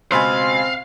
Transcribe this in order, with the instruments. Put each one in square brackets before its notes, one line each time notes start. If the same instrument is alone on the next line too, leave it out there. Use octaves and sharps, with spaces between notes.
[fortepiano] C#2 B2 [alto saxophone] C4 [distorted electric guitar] F5 [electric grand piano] G#5 B5 C6